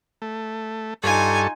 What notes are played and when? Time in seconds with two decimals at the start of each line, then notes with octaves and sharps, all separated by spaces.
0.22 A3
1.03 G2 D#4 F4 A4 G#5 C#6